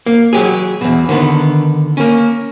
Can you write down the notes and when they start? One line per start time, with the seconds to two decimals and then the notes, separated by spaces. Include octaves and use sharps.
0.06 A#3
0.33 F#3 G4 G#4
0.81 E2 B2
1.09 D3 D#3 B3
1.97 A#3 C#4